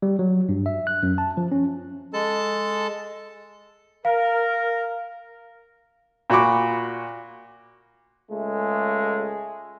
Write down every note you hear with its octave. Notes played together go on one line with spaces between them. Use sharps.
G3
F#3
G2
E5
F#6
F#2
A5
F3
C#4
G#3 A4 A5
A#4 F5
A#2 F#4 B5 C#6 D6
C#2 G#3 A3